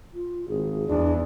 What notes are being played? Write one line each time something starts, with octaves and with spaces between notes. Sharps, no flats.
F4
G#1 G#4
E2 D4